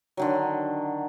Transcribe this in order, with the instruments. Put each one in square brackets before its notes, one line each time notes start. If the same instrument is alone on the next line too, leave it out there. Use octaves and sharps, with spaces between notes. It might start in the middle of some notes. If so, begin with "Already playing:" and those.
[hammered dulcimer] D3 D#3 F#3